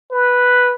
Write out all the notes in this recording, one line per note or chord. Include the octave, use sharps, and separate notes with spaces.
B4